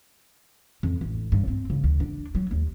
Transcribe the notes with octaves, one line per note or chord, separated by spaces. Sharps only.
F2
A1
G2
C4
C#3
D2
D4
F#3
D#2